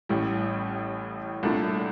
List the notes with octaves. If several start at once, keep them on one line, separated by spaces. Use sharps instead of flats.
A1 A2 G3
C2 A#2 A3 D4